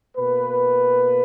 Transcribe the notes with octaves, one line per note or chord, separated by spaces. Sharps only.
B2 A#3 B4